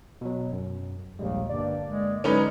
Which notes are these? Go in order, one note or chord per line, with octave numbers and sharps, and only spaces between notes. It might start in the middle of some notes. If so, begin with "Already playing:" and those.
B2 F#3
F#2
A#1 D#2 G3 G#3
G1 G2 A#3 D5
G#3
D3 F#3 G#3 C#4 D#4 B4